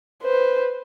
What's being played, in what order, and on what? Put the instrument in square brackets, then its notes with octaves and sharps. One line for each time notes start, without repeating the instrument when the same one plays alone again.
[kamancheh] B4 C5